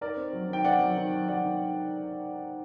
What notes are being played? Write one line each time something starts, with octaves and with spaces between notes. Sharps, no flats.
D#4 A#4 D5
C4
F#3
D#3 G5
C4 D5 F#5
F#3
D#3
F#3
F#3 D5 F#5
D#3
D#3